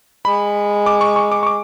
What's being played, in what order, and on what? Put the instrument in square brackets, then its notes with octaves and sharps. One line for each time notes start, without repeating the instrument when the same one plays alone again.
[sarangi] G#3 [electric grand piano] B5
[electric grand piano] D6
C#6
C#6
D6
C#6
D6